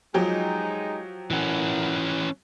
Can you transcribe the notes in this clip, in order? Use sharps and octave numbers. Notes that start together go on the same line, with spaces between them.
F3 F#3 G#3 D#4 G4
E3 C#4 E4 A#4 F#5